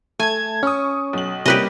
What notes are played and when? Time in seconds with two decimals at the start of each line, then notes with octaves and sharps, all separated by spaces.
0.20 A3 G#5 A5 G#6
0.63 C#4 C#6 D#6
1.13 B1 F#7
1.46 C3 G3 A#3 C#4 G4 B4 D#5